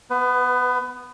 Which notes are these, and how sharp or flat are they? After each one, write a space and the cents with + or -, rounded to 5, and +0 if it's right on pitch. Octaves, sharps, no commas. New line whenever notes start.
B3 +0 B4 +25